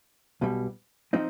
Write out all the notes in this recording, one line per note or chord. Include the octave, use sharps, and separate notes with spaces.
B1 B2 G3
F3 C4 D#4